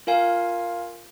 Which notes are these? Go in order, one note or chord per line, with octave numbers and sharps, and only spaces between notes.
F4 A#4 F5 G#5